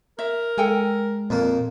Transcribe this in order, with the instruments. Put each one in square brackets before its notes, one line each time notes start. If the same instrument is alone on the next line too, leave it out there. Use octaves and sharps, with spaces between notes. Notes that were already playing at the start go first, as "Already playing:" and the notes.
[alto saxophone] A#4 [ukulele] E5
[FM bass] G#3 [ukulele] A4 G5 G#5
[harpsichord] F2 A#3 [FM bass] A#2